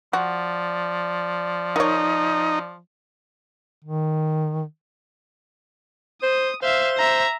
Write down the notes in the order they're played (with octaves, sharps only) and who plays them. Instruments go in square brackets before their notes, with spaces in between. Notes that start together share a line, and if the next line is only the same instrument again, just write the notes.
[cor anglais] F3 [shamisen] F#4 [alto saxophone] D5
[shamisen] D#3 C#5 [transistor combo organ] D#4
[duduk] D#3
[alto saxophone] C5 [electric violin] D#6
[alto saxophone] C5 [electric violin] E5 F5
[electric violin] E5 A#5